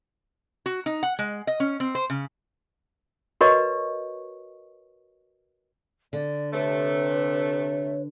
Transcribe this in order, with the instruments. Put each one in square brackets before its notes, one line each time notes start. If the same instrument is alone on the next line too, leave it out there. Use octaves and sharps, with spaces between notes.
[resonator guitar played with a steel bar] F#4
D#4
F#5
G#3
D#5
C#4
C4
C5
C#3
[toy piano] F#4 A#4 B4 C#5 D#5 C#6
[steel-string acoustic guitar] D3 [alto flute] D5
[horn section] C3 A3 [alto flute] B4 [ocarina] C#5